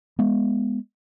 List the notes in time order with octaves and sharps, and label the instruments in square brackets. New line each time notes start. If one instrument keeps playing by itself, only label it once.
[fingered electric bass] G#3 B3